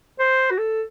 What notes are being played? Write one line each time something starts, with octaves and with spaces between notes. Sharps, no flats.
C5
F#4
A4